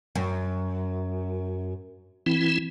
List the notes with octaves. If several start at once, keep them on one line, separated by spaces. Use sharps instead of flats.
F#2
E3 C4 E4